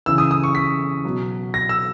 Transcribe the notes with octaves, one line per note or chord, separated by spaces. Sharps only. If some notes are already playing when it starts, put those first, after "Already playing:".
C#3 E3 E6
D#6
D#6
C#6
B6
B2 F#3
A#6
E6